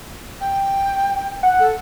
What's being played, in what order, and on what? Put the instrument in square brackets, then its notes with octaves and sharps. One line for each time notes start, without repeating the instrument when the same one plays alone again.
[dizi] G5
[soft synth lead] F#5
[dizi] A4